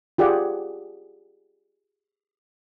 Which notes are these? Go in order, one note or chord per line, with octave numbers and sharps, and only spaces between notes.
F4 G4 G#4 D5 F#5